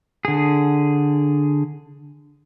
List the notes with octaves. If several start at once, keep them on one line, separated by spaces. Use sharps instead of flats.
D3 G#4